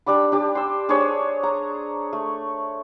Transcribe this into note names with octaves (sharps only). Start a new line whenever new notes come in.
D4 G4 D5 B5
D4 G4 A5
C6 E6
D4 G#4 C5 C#5
A#5
A3